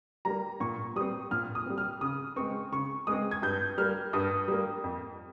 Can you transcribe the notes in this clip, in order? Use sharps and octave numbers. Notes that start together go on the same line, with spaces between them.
G3 A#3 A#5
A#2 C#6
G3 C4 D#6
A#2 F6
D#6
G3 C4
F6
C#3 D#6
G#3 C4 C#6
C#3 C#6
G#3 C4 D#6
G#6
G2 G6
G3 A#3 F6
G2 D#6
G3 A#3
F2